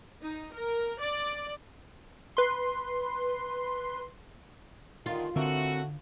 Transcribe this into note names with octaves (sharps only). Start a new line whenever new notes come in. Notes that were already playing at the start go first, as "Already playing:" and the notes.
D#4
A#4
D5
B4 C6
D3 D#3 F4
A2 D3 A3 C4 F#4 A#4 E5